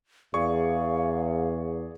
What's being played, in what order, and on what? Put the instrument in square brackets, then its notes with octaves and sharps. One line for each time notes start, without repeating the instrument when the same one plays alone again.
[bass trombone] E2 [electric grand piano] G#4 D5 C#6 [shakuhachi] F5